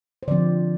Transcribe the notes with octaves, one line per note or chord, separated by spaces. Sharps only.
C5
D3 F3 C4 D5